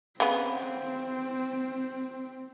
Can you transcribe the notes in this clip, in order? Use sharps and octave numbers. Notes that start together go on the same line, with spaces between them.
C#3 B3 C4